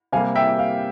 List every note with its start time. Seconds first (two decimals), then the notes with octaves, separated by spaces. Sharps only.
0.12 C3 G3 A#3 F5 G#5
0.36 E5 G5
0.59 F5